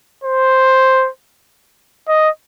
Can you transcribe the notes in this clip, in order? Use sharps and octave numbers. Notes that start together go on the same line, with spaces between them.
C5
D#5